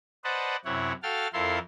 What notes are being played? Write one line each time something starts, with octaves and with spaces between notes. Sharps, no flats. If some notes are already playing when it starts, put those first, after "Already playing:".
B4 C5 D5 D#5 F#5 A5
F#2 C3 E4 C#5 F#5
F#4 A4 F5 G5 F6 A6
F2 E4 A4 A#4 F5 C6